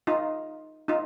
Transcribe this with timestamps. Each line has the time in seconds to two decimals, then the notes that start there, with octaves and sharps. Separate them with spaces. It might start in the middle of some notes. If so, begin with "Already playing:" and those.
0.07 D#4 F4
0.88 D#4 F4